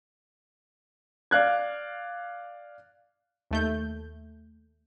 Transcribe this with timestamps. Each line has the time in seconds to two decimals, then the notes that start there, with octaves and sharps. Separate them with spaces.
1.31 D5 F5 F#6 G#6
3.51 D#2 A3 G6